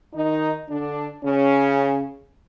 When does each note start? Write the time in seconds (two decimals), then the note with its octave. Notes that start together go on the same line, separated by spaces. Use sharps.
0.13 D#3 D#4
0.68 D3 D4
1.23 C#3 C#4